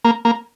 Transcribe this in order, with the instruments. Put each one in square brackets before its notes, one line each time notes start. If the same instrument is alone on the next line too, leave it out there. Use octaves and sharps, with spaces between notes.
[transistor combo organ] A#3
A#3